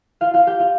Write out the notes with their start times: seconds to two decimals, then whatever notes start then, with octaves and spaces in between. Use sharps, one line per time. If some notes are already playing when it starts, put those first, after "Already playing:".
0.21 F4 F5
0.34 F4 F5
0.47 G4 G5
0.60 F4 F5